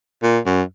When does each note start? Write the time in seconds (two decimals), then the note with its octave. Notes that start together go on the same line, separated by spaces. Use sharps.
0.23 A#2
0.46 F#2